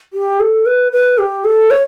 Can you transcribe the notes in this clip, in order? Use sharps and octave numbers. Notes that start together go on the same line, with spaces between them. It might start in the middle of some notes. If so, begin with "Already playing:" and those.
G4
A4
B4
B4
G4
A4
C#5